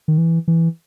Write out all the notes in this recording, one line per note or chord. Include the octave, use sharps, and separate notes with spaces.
D#3
E3
E3